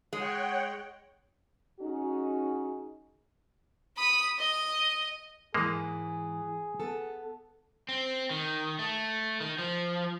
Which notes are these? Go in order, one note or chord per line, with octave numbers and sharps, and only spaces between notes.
G#3 C#5 F#5 G5
C#4 D#4 F#4 G#4
B5 D#6
D#5
G#2 E3 G#3 A#3 G#4
B3 A4
C4
D#3
A3
D#3
F3